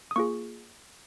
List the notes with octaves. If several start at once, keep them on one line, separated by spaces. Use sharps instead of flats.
D#6
A#3 F4 G#4 C#6